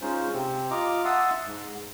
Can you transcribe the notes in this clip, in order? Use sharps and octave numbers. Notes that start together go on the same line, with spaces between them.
G#3 C#4 D#4 F4 C5
C3 C4
F4 D#5 A#5 D6
E5 F#5 A5 C6 D#6 E6
G#2